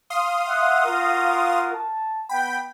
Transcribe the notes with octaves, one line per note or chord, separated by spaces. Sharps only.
F5 C6 D#6
E5 F#5
F4 F#4 A#4
A5
B3 F#5 G5 B5